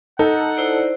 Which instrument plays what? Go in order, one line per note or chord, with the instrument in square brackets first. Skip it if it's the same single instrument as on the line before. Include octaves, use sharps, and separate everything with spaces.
[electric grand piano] D#4 [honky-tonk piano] A4 [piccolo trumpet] F#5
[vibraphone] E4 C5 D5